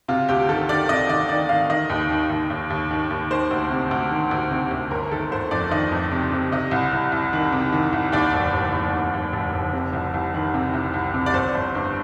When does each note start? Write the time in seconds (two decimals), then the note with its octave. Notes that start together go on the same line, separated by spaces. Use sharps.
0.08 C3 F4
0.28 D2 G4
0.49 D#3 A4
0.69 D#3 D5
0.89 C3 D#5
1.09 D#3 D5
1.29 D#3 D5
1.49 D#3 F5
1.70 D#3 D#5
1.90 D#2
2.10 D#3
2.30 D#2
2.50 D#2
2.70 D#2
2.91 D#3
3.11 D#2
3.31 D#3 C5
3.51 D2
3.71 C3
3.91 D2
4.11 D#3
4.31 D2
4.51 C3
4.71 D2
4.91 G1 A#4
5.11 D#3 A4
5.32 G1 C5
5.51 F2 D5
5.71 D#3 D#5
5.91 F2
6.12 C3
6.32 C3
6.52 C3 D#5
6.71 C2
6.92 C2
7.12 C2
7.33 D#3
7.53 C3
7.72 D#3
7.93 C2
8.12 D#2 D5
8.33 F1
8.53 F1
8.73 F1
8.92 D#2
9.14 D#2
9.33 F1
9.54 F1
9.73 C3
9.93 C2
10.14 C2
10.34 D#3
10.54 C3
10.74 C2
10.94 C2
11.14 C3
11.26 D5
11.34 G1 C5
11.55 G1
11.75 G2